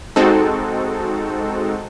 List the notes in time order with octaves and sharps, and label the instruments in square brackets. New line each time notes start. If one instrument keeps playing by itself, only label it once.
[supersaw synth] G#3 C4 D#4 F#4 A4